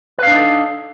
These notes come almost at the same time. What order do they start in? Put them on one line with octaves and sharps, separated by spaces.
B4 F5 D4 D#4 A4